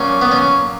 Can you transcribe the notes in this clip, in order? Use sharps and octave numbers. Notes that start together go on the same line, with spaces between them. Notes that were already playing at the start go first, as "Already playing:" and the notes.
Already playing: A#2 F#3 C#4
B3
C#4